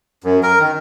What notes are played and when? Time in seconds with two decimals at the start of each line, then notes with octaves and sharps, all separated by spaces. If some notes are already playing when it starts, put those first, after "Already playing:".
0.24 F#2
0.43 A#4
0.60 D#3